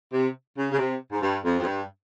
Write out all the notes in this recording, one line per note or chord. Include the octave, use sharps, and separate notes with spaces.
C3
C#3
C#3
C3
G#2
G2
F2
F2
G2